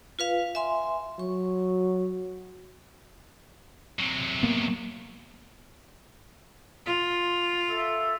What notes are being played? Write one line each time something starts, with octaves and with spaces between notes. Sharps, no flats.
F4 B4 F5
E5 G#5 C6
F#3 C#6
C3 F#3
A#3 B3
F4
A4 E5